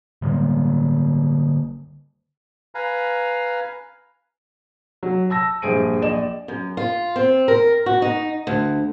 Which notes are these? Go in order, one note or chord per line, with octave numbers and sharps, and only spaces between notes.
D3 G3 A#3
B4 F5 G#5 A#5
F#3
A5 E6 A#6
A#1 G2 G#4 C5 D7 D#7
A#1 D5 D#5 E7
F#2
F4
C4
A#4
F#4
D#4
D2